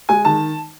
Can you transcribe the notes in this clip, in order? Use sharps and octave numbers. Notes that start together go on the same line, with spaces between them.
G#3 G#5
D#3 A5